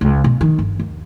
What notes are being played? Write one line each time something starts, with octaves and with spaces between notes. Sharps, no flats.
C#2
B2
D#3
G1
D#2